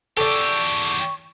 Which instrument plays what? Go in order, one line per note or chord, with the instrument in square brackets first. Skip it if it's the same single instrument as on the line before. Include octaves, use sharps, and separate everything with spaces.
[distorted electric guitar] E2 G4 [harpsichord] A4 D5 [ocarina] C#6